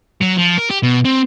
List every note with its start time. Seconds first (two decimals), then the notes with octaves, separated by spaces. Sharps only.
0.22 F#3
0.38 F3
0.58 A#4
0.70 G4
0.83 B2
1.05 C4